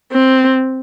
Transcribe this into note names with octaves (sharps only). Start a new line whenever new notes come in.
C4